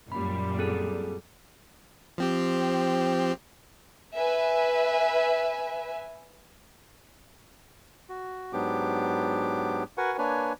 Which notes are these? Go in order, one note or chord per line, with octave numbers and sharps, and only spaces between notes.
F#2 A#2 G3 B5
C4 G#4 A4
F3 C4 G4
B4 E5 G#5
F#4
G#2 F#3 B3 D4 G4 D6
F#4 A#4 B4 F#5 G#5 C#6
A#3 D4 B4 C#5 G#5